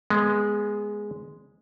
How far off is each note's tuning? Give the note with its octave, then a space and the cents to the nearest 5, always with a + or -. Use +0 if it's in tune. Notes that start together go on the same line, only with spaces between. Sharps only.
G#3 +0 B3 -15